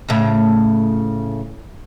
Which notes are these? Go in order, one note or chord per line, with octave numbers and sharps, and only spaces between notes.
A2 C#3